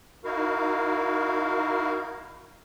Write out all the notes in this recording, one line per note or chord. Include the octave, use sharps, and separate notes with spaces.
D#4 E4 F#4 A#4 F5